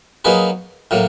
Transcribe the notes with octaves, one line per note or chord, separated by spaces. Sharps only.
F#3 A#3 D#4 G#4 B4
A2 F#3 A#3